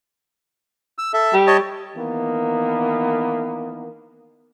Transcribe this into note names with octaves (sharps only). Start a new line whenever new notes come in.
E6
A4 E5
G3
C#5 D#5 A5
D#3 E3 A#3 B3